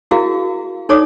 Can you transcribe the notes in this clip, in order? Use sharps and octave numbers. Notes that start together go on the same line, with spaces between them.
E4 F#4 G#4 A#4 F5
D#4 A4 C#5 D5 D6 D#6